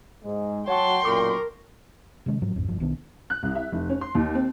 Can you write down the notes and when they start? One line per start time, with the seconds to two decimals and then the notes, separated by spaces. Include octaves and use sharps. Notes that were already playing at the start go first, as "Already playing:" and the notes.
0.24 G#2 G#3
0.68 F#3 F#4 C#5 F#5 G5 A5 C6 C#6
1.05 B1 F#2 A#2 A#4 C#6 D6
2.26 C3 D#3 G#3 C#4
2.42 G#2 F3 F#3
2.56 A1 F2 G#2
2.68 F#1 G2 F3
2.80 B1 D#3 B3 D4
3.30 F#6
3.43 C2
3.55 E5
3.72 F1
3.89 C#4
4.01 C6
4.15 D#2
4.35 C4